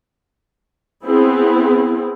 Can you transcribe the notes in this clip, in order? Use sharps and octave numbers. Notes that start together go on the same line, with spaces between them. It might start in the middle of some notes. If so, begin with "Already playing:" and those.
B3 C4 E4 G#4